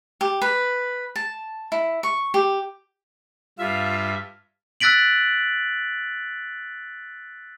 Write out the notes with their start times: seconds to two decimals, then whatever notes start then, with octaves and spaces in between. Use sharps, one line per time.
0.21 G4
0.42 B4
1.16 A5
1.72 E4
2.03 C#6
2.34 G4
3.59 G2 F4 E5 F5
4.80 E6 F#6 A6 B6 D7 F#7